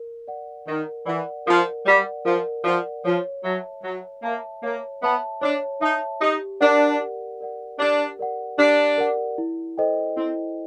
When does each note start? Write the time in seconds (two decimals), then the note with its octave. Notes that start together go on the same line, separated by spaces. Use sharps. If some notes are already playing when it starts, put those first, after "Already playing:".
Already playing: A#4
0.28 D5 F#5
0.67 D#3 A#4
1.06 E3 D5 F#5
1.46 F3 A#4
1.86 G3 D5 F#5
2.25 F3 A#4
2.64 F3 D5 F#5
3.05 F3 C#5
3.44 F#3 E5 A5
3.83 F#3 C#5
4.23 A#3 E5 A5
4.63 A#3 C#5
5.02 B3 E5 A5
5.41 D4 C#5
5.81 D#4 E5 A5
6.21 D#4 G4
6.60 D4 A#4 D5 F#5
7.00 G4
7.41 A#4 D5 F#5
7.79 D4 G4
8.19 A#4 D5 F#5
8.58 D4 G4
8.98 A#4 D5 F#5
9.38 E4
9.78 A4 C5 D#5 G5
10.17 C4 E4